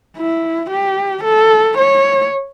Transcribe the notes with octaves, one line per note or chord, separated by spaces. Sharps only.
E4
G4
A4
C#5